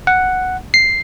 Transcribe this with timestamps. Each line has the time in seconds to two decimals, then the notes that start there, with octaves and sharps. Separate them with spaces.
0.07 F#5
0.74 C7